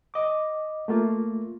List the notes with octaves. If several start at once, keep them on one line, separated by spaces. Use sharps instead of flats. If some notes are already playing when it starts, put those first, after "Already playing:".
D#5 D6
A3 A#3 F4